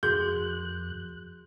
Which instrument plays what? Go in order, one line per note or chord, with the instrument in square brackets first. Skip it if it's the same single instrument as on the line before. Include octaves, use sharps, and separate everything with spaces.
[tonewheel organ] F2 F#6 [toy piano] F#4 G#4 A#4 [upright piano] G6